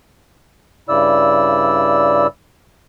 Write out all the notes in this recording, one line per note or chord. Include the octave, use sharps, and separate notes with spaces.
G2 C#3 E4 D5 E6